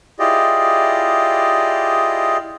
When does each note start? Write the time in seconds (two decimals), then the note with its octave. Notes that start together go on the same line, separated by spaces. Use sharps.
0.19 E4 F4 G4 G#4 D5 D#5